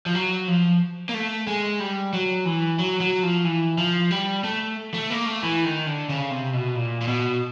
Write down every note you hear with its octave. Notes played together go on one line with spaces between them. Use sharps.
F3
F#3
F3
A#3
A3
G#3
G3
F#3
E3
F#3
F#3
F3
E3
F3
G3
A3
A3
A#3
A3
E3
D#3
D3
C#3
C3
B2
A#2
A#2
B2